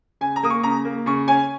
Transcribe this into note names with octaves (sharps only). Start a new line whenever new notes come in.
C#3 G#5
A#5
A#3 D#6
C#6
C#3 A#5
A#3
C#3 C#6
C#4 G#5